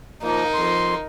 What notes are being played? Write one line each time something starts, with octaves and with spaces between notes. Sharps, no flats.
F3 A#3 D#4 A#4
F2 C6